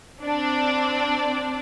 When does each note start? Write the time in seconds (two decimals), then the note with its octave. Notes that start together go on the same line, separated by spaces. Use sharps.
0.23 C4 D4 D5